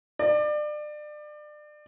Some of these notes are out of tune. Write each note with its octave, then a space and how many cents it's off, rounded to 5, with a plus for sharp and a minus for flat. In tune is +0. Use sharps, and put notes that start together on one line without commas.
D5 +30